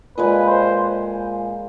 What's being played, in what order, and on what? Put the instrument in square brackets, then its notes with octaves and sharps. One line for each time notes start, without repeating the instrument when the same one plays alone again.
[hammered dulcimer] A#2 F3 G#3 [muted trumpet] B4
[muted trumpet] C5